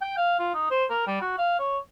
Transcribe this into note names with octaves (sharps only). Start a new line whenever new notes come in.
G5
F5
F4
D#4
C5
A#4
G3
F#4
F5
C#5